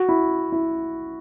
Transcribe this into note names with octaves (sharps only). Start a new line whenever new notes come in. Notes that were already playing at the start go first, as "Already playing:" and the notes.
Already playing: F#4
E4
E4